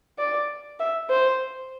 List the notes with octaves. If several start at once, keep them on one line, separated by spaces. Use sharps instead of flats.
D5
E5
C5